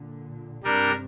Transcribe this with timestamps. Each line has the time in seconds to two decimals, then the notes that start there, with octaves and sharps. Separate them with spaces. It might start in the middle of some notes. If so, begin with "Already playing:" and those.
Already playing: A#2 D3
0.63 G2 C3 G3 D4 A#4